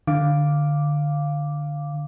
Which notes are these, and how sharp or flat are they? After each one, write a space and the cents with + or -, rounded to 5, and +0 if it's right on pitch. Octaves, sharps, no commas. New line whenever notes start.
D3 +10 F5 +0 D6 +0